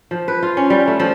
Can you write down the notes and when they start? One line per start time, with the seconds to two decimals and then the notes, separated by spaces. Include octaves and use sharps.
0.11 F3
0.28 B4
0.42 F4
0.57 C#4
0.70 G3
0.87 A3
1.00 F3